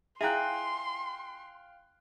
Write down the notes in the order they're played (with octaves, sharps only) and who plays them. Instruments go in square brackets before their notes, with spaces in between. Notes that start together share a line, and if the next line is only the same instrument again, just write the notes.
[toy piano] E4 F4 E5 [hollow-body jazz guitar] G#4 [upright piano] F5 G5 F#6 [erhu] C6